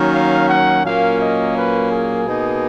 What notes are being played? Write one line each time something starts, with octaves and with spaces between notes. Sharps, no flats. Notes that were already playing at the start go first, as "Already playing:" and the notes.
Already playing: D#3 F#3 A#3 C#4
F5
F#5
A#2 F#3 A#3 C#4 F5
D#5
B4
G#4
B2 A#3 D#4